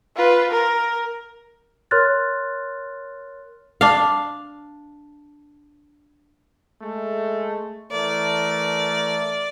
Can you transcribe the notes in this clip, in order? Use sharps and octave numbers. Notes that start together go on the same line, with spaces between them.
F4 B4
A#4
A#4 C#5 C6 F6 F#6 A6
D4 F5
G#3 A3
E3 A3 A#4 D5